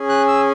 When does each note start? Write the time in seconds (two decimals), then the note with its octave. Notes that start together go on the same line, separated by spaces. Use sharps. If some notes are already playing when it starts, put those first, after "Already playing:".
Already playing: C#4 G#4
0.09 F#6
0.28 E6